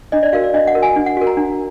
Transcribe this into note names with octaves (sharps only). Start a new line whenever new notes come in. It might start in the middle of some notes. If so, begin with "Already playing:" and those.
D4 D#5
D5
F#4 A#4 F5
D5
D4 D#5
F#5
F#4 A#4
G#5
D4
F#5
F#4 A#4
A#5
D4